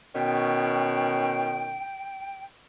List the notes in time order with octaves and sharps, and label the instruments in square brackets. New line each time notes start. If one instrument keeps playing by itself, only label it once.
[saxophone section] B2 D#3 C#4 [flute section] G5